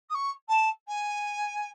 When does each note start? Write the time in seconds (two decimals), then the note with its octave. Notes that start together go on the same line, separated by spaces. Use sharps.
0.09 D#6
0.14 C#6
0.48 A5
0.87 G#5